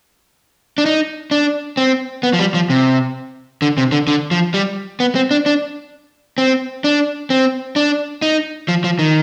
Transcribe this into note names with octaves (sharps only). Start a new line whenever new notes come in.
D4
D#4
D4
C4
B3
F3
G3
F3
C3
D3
C3
D3
D3
F3
G3
B3
C4
D4
D4
C4
D4
C4
D4
D#4
F3
F3
D#3